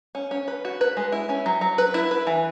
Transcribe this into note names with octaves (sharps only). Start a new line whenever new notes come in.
C#4
C#4
B4
F#4
B4
G#3
E4
C#4
F#3
F#3
B4
E4
B4
E3